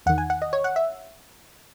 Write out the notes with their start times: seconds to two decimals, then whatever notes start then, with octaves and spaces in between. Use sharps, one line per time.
0.06 E2 D#3 F#5
0.18 G#5
0.30 F#5
0.42 D#5
0.53 C#5
0.64 F#5
0.76 E5